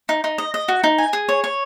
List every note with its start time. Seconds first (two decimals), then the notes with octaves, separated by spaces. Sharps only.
0.09 D#4
0.24 D#4
0.38 D#5
0.54 D#5
0.68 F#4
0.84 D#4
0.98 G#5
1.13 G#4
1.29 C#5
1.44 C#5